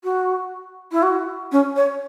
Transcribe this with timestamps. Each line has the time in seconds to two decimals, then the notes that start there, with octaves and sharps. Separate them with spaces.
0.04 F#4
0.92 E4
1.03 F#4
1.52 C#4
1.76 C#5